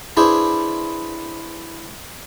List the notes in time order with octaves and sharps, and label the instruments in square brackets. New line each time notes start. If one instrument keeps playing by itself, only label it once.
[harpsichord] D4 E4 G#4 B4 C5